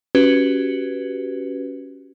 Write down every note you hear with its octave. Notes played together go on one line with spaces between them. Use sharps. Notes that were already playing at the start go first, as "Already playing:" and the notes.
C#4 F#4 G4 B4